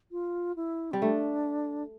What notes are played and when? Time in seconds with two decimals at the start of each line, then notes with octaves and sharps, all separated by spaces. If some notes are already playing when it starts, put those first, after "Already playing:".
0.12 F4
0.56 E4
0.91 G3 C4
1.01 A3 D4